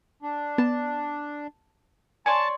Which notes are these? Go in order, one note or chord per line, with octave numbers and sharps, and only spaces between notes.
D4
B3 A5
C#5 D5 G#5 A5 C6